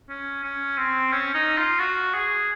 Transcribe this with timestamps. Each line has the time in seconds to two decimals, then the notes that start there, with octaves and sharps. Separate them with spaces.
0.09 C#4
0.43 C#4
0.78 C4
1.12 C#4
1.34 D#4
1.58 F4
1.79 F#4
2.14 G#4